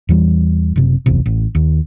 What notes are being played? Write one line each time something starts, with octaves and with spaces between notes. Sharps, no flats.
E2 E3 G3
F#1 C3
F#1 B1 E2 C3
A1
D#2